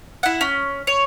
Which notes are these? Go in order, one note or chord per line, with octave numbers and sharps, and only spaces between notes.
E4 F#5
C#4
C#5